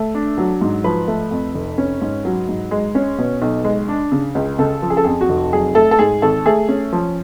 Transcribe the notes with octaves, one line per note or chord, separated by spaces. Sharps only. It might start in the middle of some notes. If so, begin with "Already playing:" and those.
Already playing: A3
D4
F#3
G#2
F3 B4
A3
F2
F1
C#4
G#2
F#3
G#2
G#3
C#4
B2
B1
G#3
D4
C#3
C#2
C#3 A4
F3
G#4
A4
F2 G#4
F#4
F1
F#3 G#4
A3 A4
A4
G#2 G#4
G#1 A4
A3 G#4
C#4
F3